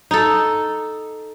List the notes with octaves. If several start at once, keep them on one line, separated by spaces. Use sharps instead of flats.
D#4 A4